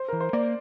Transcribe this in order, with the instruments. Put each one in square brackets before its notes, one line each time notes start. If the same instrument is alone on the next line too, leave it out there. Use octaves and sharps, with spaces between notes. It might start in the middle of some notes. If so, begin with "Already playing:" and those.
Already playing: [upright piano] C5
[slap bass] E3 [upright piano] A#4
[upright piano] C5
[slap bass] A#3 [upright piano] D5